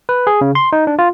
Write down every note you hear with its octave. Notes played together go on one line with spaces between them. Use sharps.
B4
G#4
C#3
C6
D#4
D4
F4